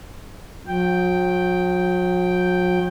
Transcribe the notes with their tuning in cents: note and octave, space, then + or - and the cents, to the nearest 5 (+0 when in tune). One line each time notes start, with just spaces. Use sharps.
F#3 -45 G5 +0